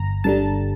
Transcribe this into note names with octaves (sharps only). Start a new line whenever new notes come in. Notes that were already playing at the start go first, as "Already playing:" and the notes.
Already playing: G1 A#5
G2 D3 G3 A5